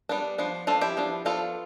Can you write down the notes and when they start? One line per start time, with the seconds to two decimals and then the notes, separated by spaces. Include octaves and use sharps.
0.09 G3 B3 D4
0.38 F3 B3 D4
0.67 F3 B3 D4 F4 A4
0.81 E4 G4
0.97 F3 B3 D4
1.25 F3 B3 D4 F4 A4